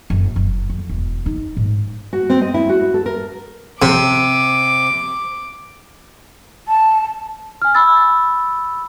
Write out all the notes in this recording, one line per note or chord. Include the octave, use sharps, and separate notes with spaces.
F#1
F#1
F2
E1
D#4
G#2
F#4
C4
D#5
E4
F#4
A4
A#4
C3 D6
A5
G#5 F6
B5 E6 A6